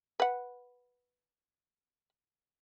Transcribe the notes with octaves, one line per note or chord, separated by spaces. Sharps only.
B4 F#5